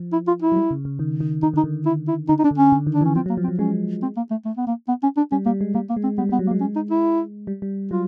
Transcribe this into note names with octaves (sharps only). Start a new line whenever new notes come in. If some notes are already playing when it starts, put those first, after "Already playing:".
Already playing: F3
E4
F4
E4
F#3
G3
C#3
C#3
D#3
D#3
D#3 D#4
D3 D#4
D#3
E4
E4
D3 D#4
D#4
D4
D3
C#4
D3
D#3
D4
E3
C#4
F3 C4
F#3
A#3
F3
C4
F#3
G#3 C#4
C4
A#3
A3
A3
B3
A#3
B3
C#4
D4
G3 C#4
G3 A#3
G#3
G3 A#3
A#3
G#3
C4
G3 B3
G3
B3
F#3
A#3
G#3
C#4
D#4
E4
G3
G3
F#3 F4